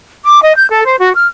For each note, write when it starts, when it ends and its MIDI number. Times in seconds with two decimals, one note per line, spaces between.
0.24 0.41 86
0.42 0.55 75
0.55 0.68 91
0.70 0.82 69
0.85 0.95 72
0.98 1.09 66
1.14 1.27 89